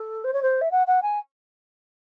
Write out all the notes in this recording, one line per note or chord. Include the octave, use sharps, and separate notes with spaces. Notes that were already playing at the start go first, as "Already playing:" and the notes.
Already playing: A4
C5
C#5
C5
E5
F#5
F#5
G#5